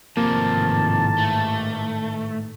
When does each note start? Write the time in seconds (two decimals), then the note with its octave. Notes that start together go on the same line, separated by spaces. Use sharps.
0.17 A1 G#2 C3 D#3 F3 A#3 A5
1.18 A3